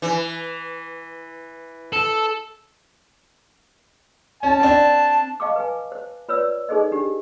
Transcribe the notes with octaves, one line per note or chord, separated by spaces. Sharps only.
E3
A4
C#4 A5
C4 D4
D#5 F5 G5 A5 C#6 D6
B4 G#5
C5
F4 B4 C#5 D5 E6
D#4 G#4 A4 C5 D#5
D4 G4